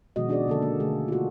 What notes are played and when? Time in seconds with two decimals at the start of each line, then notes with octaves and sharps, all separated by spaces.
0.16 B2 D#3 F3 G#3 F#4 D#5
0.28 C#4 D4 F#4 G#4 D5
0.48 D3 A#3 A4
0.62 A#3
0.80 D3 A3 G#4
1.08 F4 F#4